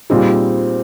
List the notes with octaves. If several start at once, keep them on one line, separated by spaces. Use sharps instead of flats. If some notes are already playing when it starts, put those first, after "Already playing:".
A#2 G3 C4 D#4 G#4